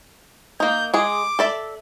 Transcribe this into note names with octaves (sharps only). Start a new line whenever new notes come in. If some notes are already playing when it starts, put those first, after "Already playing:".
A#3 D#4 G6
G#3 G#4 D6
A4 D5 E5